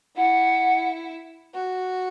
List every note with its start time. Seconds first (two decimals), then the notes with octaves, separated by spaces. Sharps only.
0.16 E4 F#5
1.54 F#4